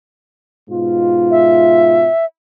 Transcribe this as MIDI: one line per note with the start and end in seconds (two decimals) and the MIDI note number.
0.69 2.08 44
0.69 2.08 47
0.69 2.08 65
1.31 2.25 76